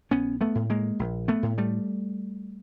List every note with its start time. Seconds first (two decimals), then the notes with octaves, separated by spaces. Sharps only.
0.11 A#1 B3 C#4
0.41 A3 B3
0.55 A2
0.70 G#3 A#3
0.99 A#1
1.28 A3 B3
1.43 A2
1.58 G3 A3